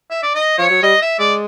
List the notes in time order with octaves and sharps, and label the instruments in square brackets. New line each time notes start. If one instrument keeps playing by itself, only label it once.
[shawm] E5
D5
D#5
[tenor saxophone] F3 [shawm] C#5
[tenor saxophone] F#3
[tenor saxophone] G3 [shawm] D#5
[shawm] E5
[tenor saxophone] G#3 [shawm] D5